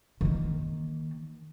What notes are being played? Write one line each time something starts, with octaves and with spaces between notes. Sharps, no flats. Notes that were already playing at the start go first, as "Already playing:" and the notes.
D#3 A#3